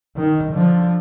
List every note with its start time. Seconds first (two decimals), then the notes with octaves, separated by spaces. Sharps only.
0.16 D#3
0.52 D3 F3